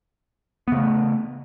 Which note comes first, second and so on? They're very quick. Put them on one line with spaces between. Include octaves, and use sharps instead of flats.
B3 C#3 A3